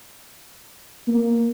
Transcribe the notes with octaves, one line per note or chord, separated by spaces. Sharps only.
A#3